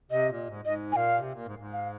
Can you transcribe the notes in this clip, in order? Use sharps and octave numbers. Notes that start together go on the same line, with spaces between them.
C3 D#5
A#2
G#2
G#2 D#5
A#2 F5 G#5
C3
A#2
G#2
G#2
F5